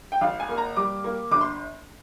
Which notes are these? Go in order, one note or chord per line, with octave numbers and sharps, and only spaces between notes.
G5
G#1 F5
G#5
A#3
A#5
G3 D6
A#3
G1 D6
C6